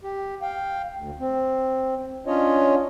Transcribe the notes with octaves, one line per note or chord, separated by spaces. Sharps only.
G4
F5 G5
D2
C4
C#4 D4 F4 C#5 D#5